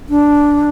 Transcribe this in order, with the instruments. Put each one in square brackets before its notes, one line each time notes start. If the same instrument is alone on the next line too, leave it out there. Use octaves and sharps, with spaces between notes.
[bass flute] D4